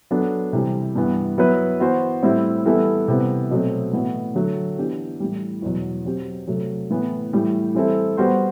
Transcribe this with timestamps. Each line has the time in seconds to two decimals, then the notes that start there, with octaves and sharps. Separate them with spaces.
0.11 F#3 B3 D4 A4
0.53 C3 E3 G3
0.95 G2 E3 B3
1.38 F#3 B3 E4 B4
1.80 E3 B3 F#4 C5
2.23 A2 G3 C4 E4
2.65 E3 G3 B3 E4 A4
3.08 C3 E3 G3 B3
3.51 B2 F#3 A3 C4
3.93 A2 E3 B3 F#4
4.35 D3 F#3 A3
4.78 E3 B3 D4 G4
5.20 A2 E3 G3
5.62 E2 B2 F#3
6.05 F#3 C4 G4
6.47 C3 F#3 A3
6.91 A2 E3 B3
7.33 A2 E3 G3
7.75 E3 G3 C4 E4 A4
8.17 G3 B3 F#4 C5